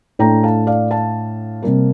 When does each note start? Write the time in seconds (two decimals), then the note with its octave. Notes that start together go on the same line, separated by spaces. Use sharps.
0.19 A2 A3 D4 G5 A#5
0.43 F5 A5
0.67 D5 F5
0.91 F5 A5
1.63 C3 G3 A#3